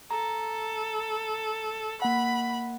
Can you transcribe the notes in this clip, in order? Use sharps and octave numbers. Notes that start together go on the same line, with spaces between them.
A4 A#5
A#3 F#5 B5